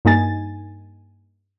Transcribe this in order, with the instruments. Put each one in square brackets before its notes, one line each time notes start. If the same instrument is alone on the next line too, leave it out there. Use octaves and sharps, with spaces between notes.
[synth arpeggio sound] G2 A#3 D#4 G#5 A6